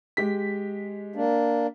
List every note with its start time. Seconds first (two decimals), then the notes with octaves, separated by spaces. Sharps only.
0.17 G#3 G4 B6
1.16 A#3 D4